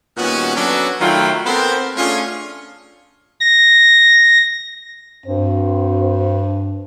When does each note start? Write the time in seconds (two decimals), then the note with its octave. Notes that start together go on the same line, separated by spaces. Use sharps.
0.17 A#2 D#3 G3 B3 C#4 F#4
0.55 F#3 B3 C#4 D4 F#4 A4
1.00 D#3 F#3 A3 F4 G5 B5
1.46 B3 C4 A4 A#4 C5
1.95 A3 C#4 D4 F4 G#4 C#5
3.41 A#6
5.26 G2 C4 F#4 C5